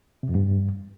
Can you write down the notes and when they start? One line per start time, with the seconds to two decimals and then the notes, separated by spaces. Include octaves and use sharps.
0.23 C3
0.29 F2
0.35 G2